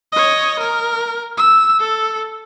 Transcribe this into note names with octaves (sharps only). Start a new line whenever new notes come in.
C#5 D#5
A#4
E6
A4